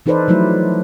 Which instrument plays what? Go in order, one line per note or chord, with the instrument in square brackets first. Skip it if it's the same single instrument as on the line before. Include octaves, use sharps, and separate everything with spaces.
[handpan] E3 D#4 A4 B4 C5 D5
F3 F#3 A3 E4